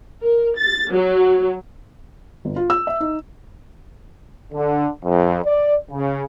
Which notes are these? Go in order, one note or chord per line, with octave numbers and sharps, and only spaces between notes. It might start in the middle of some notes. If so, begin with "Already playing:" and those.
A#4
A6
F#3
G1
F4
E6
E5
D#4
D3
F2
D5
C#3